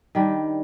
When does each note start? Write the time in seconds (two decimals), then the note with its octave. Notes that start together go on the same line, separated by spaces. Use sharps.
0.15 D#3 G3 D4